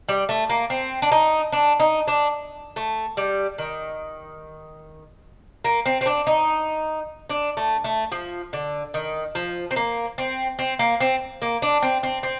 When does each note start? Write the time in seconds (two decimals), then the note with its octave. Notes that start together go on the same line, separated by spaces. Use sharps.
0.09 G3
0.29 A3
0.50 A#3
0.70 C4
1.02 D4
1.12 D#4
1.52 D4
1.80 D#4
2.08 D4
2.76 A3
3.17 G3
3.58 D#3
5.65 A#3
5.86 C4
6.01 C4
6.06 D4
6.27 D#4
7.29 D4
7.57 A3
7.84 A3
8.12 F3
8.53 D3
8.94 D#3
9.35 F3
9.71 C4
9.76 A#3
10.18 C4
10.59 C4
10.79 A#3
11.00 C4
11.42 A#3
11.62 D4
11.83 C4
12.03 C4
12.23 C4